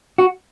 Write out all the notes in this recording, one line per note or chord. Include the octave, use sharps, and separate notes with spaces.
F#4